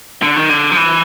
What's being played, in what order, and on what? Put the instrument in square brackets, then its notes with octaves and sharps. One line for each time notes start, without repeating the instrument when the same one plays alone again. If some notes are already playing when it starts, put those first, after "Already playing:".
[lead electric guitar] D3
D#3
D3
F3
E3